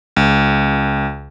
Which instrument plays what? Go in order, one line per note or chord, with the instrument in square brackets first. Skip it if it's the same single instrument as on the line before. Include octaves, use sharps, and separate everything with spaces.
[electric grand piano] C#2